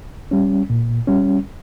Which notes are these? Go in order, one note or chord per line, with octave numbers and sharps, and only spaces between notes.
G3 C#4
A#2
G3 C#4